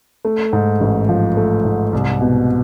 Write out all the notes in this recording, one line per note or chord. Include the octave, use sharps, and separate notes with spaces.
A3
G#2
A1
F3
A3
G#2
C2
B2